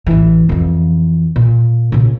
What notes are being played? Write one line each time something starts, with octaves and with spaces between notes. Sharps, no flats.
A1 E3
F2 E3
A#2
A#2 C#3